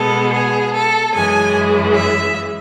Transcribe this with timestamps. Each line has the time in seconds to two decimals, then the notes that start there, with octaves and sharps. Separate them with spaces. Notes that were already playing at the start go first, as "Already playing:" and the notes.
Already playing: B2 G#3 B3 A4
0.33 G#4
0.74 A4
1.14 F#2 E3 G#3 G#5
1.95 E5